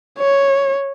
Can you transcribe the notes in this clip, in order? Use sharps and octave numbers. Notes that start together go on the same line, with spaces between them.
C#5